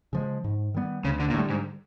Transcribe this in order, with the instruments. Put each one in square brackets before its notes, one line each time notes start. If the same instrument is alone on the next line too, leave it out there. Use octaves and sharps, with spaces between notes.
[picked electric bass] C#3 F3 G#3
G#2
D#3 G3 B3
[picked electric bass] D2 [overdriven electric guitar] C#3
[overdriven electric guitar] D3
A#2
[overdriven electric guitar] A2 [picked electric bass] D3
[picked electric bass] G3
[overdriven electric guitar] G#2